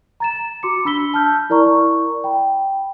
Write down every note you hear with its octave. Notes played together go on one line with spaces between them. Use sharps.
A#5 A6 E7
F#4 C6 D6 C#7
D4 B5 E6 B6 G7
A5 F6 G6
E4 A#4 D5 A#5 C#6
G5 B5